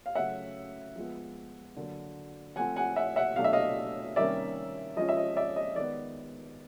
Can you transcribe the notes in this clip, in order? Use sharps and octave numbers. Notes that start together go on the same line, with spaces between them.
F5
C#3 F#3 A3 C#4 E5 F#5
F3 G#3 B3
D3 F#3 A#3
F3 A3 C4 F#5 G#5
F#5 G#5
E5 F#5
E5 F#5
B2 F#3 A3 D4 F5
E5
D#5 F5
C3 D#3 G3 A#3 C#4 D5 E5
F3 G#3 C#4 D#5
E5
D#5
D5 E5
D#5
D#3 G#3 B3 D5